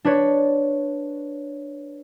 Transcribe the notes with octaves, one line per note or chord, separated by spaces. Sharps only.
D4 B4 C#5